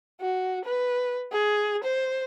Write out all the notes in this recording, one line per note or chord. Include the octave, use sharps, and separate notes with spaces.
F#4
B4
G#4
C5